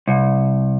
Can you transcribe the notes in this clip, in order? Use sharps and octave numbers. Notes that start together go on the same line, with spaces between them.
C2